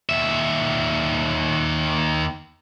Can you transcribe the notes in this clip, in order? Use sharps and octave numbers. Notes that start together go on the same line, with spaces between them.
D#2 E5